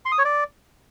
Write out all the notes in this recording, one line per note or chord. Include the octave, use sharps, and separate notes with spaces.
C6
D#6
C#5
D5